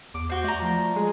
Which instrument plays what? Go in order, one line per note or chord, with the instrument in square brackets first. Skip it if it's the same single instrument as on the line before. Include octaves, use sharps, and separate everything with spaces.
[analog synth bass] E2 [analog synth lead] D6
[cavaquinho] F#4 C5 [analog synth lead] G6
[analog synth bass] A3 [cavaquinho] D5 A#5
[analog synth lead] F3
[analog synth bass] G#3 [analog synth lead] G#4